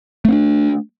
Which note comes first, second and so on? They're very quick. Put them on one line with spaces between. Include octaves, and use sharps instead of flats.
A3 C4 D4